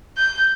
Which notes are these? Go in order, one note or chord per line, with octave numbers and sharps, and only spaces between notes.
G6